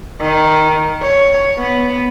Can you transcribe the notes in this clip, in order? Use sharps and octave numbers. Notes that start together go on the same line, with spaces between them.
D#3
C#5
B3